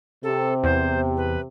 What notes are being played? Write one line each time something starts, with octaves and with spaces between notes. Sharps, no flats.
C3 A4
E2 C5
B4